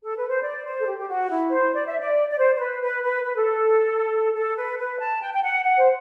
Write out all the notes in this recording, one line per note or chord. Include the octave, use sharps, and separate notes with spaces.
A4
B4
C5
D5
C5
A4
G4
G4
F#4
E4
C5
D5
E5
D5
D5
C5
C5
B4
B4
B4
B4
A4
A4
B4
B4
A5
G5
G5
F#5
F#5
C5